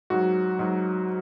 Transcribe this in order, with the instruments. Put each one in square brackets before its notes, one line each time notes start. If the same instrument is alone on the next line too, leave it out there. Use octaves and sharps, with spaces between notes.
[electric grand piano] G#2 F#3 F#4
G#2 F#3